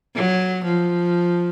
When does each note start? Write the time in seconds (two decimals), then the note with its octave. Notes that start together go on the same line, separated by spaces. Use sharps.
0.15 F#3
0.64 F3